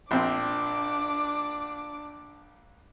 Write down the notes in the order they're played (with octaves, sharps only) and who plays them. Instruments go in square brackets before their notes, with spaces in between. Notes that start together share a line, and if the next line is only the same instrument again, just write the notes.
[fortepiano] A#1 C4 [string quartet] D4 D6